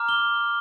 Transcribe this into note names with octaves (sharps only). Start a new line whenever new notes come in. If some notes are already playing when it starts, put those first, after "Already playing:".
Already playing: A#5 D6 F6
G7